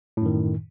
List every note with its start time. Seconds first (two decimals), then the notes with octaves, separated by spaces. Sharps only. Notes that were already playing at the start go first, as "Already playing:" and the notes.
0.17 A2
0.21 F#2
0.26 D#3